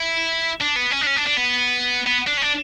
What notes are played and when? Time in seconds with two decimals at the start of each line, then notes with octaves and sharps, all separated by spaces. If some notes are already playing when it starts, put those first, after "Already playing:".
Already playing: E4
0.61 D4
0.76 B3
0.91 C#4
1.01 D4
1.06 C#4
1.16 D4
1.26 D4
1.37 B3
2.07 B3
2.27 D4
2.38 C#4
2.42 D4